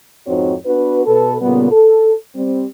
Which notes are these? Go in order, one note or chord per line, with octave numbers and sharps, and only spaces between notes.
F2 G#2 C4 D#4 F#4 C#5
B3 D4 F#4 B4
B2 A4 B4
A#2 C#3 G3 B3
A4
G3 C4